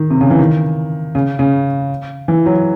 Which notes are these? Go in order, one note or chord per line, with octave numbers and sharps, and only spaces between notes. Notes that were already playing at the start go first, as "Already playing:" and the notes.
Already playing: D#3
C3
C#3
E3
D#3
C#3
C#3
E3
F#3